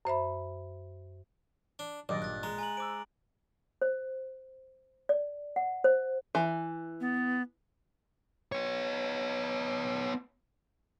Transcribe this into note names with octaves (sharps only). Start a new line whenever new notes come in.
F#2 C5 E5 B5
D4
G2 A#2 D#3 F#3 D5 D#5
G#1 A#2 F#6 A6
G#3 A#5
G#5 A#5 F#7
C5 D6 E6 D7
C5
D5
F#5
C5
E3
B3
B3 C#5